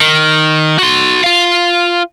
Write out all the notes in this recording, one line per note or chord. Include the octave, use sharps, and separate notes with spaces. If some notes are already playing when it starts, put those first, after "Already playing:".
D#3
F#4 C6
F4 F5